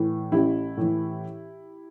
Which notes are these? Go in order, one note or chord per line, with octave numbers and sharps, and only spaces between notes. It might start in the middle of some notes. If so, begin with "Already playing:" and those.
Already playing: A2 E3
A1 E4 G4
A2 E3